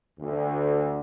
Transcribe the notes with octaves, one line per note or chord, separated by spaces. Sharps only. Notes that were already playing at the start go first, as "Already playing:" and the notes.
D2